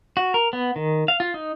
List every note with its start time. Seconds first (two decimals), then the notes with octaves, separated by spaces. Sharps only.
0.17 F#4
0.34 A#4
0.53 B3
0.76 D#3
1.08 F5
1.20 F4
1.34 D#4